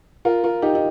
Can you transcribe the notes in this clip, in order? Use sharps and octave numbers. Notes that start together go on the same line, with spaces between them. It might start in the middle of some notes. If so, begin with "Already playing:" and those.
F4 A#4
F4 A#4
D#4 G4
D#4